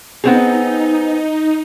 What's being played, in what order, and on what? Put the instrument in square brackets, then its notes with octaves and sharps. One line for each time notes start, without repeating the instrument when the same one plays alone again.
[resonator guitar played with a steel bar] B3 C4 G#4 [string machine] D#4